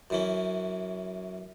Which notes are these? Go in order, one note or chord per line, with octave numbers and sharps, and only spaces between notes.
F#2 E3 C#4